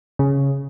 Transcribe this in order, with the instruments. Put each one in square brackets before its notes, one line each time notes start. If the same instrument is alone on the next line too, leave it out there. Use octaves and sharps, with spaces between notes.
[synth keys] C#3